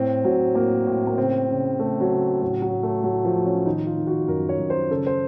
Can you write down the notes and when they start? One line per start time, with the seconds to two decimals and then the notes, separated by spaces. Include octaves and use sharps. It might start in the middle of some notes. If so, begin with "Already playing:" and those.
Already playing: A2 C4
0.24 A2 F#3
0.55 A2 A#3
0.87 A2
1.07 A#3
1.17 C#3 C4
1.49 C#3
1.79 C#3 A3
2.01 F#3
2.11 C#3
2.41 A2 F#3
2.62 F#3
2.72 A2
2.83 A3
3.04 A2 F#3
3.25 F3
3.35 A2
3.46 C#4
3.66 D#3 D#4
3.87 F4
3.97 D#3
4.07 F#4
4.28 F#2 A#4
4.49 C#5
4.59 F#2
4.70 C5
4.90 C#3 A4
5.06 C5